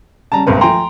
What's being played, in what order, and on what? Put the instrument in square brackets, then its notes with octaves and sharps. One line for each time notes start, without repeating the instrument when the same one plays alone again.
[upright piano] C#3 G3 C#4 [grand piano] A5 A#5
[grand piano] F#1 C2 G2 [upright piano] G#3 A#4 B4
[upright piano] F3 A3 G#5 [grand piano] G5 A#5 C6